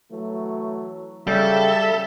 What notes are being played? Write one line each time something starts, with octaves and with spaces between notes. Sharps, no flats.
E3 F#3 A3
C#3 G3 A4 E5